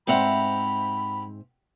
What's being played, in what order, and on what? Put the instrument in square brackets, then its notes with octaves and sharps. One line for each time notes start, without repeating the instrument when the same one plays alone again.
[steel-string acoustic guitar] G#2 C4 E5 [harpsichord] G4 F#5 A#5 [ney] B5